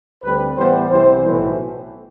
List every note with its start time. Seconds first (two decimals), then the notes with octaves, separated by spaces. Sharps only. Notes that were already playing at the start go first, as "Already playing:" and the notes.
0.23 D2 D3 G3 C4 B4
0.57 A2 E3 G3 B3 C5
0.90 C2 C3 E3 G3 C5
1.23 B1 A2 E3